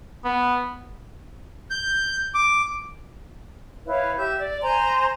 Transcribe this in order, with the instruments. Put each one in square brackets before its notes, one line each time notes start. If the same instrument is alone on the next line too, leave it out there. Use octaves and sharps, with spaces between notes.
[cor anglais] B3
[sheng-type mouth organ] G6
D6
[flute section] E4 B4 C#5 F5
G4 E5 G6
D5
C5 G#5 A#5 C6